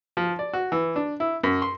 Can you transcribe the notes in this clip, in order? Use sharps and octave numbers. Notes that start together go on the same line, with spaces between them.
F3
D5
F#4
E3
D4
E4
F#2
C6